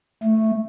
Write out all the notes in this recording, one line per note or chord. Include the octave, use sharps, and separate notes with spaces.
A3